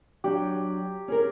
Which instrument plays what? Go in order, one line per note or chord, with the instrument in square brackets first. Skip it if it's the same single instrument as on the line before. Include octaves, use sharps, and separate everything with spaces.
[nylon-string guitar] F#3 D4 [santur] G4
[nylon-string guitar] C#4 G#4 A#4